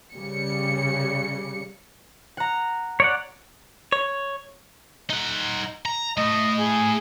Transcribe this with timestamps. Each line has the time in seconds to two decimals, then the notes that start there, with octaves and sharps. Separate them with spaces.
0.15 C#3 G3 C#7
2.37 F#5 A#5
3.00 C#5 D5 F#5
3.92 C#5
5.10 D#4 F#5
5.86 A#5
6.17 A2 A3 D#5
6.60 G#4